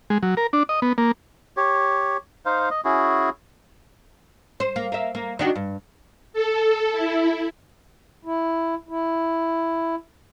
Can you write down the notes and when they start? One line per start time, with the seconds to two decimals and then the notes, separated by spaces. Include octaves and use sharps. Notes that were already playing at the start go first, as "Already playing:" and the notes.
0.10 G#3
0.23 F#3
0.37 A#4
0.53 D4
0.69 D#5
0.82 B3
0.98 A#3
1.57 G4 C#5
2.45 D#4 C5 F5
2.70 D#5
2.85 C#4 E4 F#4 G#4
4.60 C5
4.76 A#3
4.92 A#3 E5
5.15 A#3
5.39 D#3 D4 F#4
5.55 G2
6.33 A4
6.92 E4
8.25 E4
8.89 E4